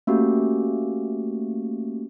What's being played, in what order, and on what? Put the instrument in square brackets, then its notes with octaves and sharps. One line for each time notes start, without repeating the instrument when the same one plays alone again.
[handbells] A3 A#3 C#4 F#4 G4